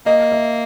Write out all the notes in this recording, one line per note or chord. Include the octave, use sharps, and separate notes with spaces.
A#3 D#5
E5